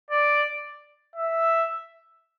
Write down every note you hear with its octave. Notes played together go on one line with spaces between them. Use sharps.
D5
E5